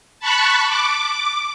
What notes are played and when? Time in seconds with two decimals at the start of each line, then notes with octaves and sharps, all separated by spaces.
0.20 A5 B5 C#6 F#6
0.66 D6